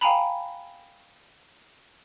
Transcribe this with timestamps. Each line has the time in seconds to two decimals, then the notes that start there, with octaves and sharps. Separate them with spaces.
0.01 F5 G5 G#5 A#5 B5